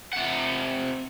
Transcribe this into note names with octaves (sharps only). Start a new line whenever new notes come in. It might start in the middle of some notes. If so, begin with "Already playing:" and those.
C3 F#5